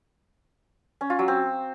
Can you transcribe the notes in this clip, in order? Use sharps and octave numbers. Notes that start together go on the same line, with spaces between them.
C#4
F4
F#3
C4